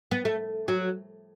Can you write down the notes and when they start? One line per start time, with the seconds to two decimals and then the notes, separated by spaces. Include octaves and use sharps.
0.11 B3
0.25 A3
0.68 F#3